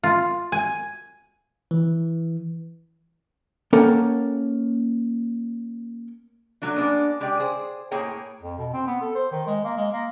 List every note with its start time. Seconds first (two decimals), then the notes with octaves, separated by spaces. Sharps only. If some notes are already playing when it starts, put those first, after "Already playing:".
0.04 F4
0.52 G#5
1.71 E3
3.73 A#3 C#4 A4 A#4 F#5 G5
6.62 F#3 A3 D4
6.76 A#3 B3 D4 G#4
7.20 G#3 G4 G#4 D5 G5
7.40 G#4 C5
7.91 A2 A#3 G#4 C#5 G5
8.43 F2
8.58 B2
8.74 C4
8.87 B3
9.01 A4
9.15 C5
9.31 D#3
9.47 G#3
9.64 A#3
9.77 G#3
9.92 A#3